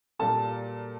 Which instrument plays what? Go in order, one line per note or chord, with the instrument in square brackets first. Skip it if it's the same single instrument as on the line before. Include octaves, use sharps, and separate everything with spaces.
[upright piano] A#2 G3 A#3 A4 A5